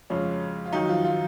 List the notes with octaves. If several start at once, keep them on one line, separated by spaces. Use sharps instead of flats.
F2 C#3 F3 G#3 C#4
F4
F#2 D#3 F#3 D#4
F3 F4
F3 F4